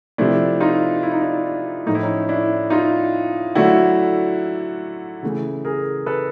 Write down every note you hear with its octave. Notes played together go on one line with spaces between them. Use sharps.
C3 F3 A3 D4 E4
D#4 F4
E4
D#4
D4 E4
A2 F3 A3 D#4
E4
C#4 D#4
D4 E4
D#4 F4
D3 F#3 A3 E4 F#4
C#3 E3 A3
G#4 A#4
A4 B4